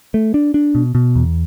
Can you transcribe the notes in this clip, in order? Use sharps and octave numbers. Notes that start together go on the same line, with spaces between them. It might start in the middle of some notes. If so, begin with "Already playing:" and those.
A3
D4
D4
B2
B2
E2